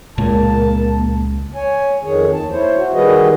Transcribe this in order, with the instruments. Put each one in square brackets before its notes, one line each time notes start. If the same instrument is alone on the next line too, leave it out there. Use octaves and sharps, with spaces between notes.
[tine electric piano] C#2 [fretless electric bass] A#2 [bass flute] A#3 [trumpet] A5
[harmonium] C#5 G#5
F2 D#3 G#4 C#5
D#2 A5
E4 C5 C#5
F#4
D#3 G3 F#4 G#4 B4 D#5